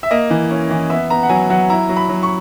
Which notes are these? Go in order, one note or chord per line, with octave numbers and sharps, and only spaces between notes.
E5
A#3 D#5
E3
C#4
E3
B3 E5
B3 A#5
F#5
F#3 G#5
F#3 F#5
E4 A#5
F#3
B5
F#3
C#6